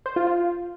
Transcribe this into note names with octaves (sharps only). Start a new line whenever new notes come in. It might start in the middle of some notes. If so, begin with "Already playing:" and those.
C5
F4
F4